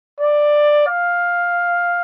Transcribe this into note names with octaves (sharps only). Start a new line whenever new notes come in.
D5
F5